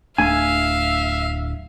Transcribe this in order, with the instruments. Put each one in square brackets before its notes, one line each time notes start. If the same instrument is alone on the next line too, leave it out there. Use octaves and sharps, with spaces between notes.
[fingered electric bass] D1 A3 D4 [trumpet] E5 [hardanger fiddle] F5 [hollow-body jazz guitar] G#5